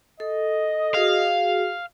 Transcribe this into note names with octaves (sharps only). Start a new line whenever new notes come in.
A4 D#5
F#4 G#4 F5